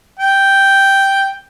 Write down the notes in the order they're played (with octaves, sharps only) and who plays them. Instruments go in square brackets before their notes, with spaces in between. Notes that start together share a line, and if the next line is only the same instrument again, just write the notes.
[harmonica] G5